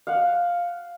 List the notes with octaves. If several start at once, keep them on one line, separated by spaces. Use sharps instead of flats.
F5 F#5